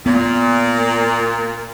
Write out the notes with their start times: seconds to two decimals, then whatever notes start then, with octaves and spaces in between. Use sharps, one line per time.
0.06 A#2 B3